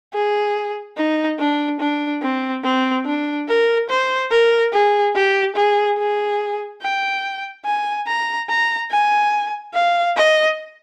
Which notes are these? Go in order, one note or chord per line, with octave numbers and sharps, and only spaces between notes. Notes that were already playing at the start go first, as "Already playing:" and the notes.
G#4
D#4
D4
D4
C4
C4
D4
A#4
C5
A#4
G#4
G4
G#4
G#4
G5
G#5
A#5
A#5
G#5
F5
D#5